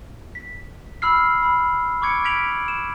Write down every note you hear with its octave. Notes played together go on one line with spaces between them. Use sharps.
B6
B5 E6 F6 C7
B5
B5 C#6 D6 G#6 C#7 D7
F6 G#6 B6 D7 F7 F#7
E7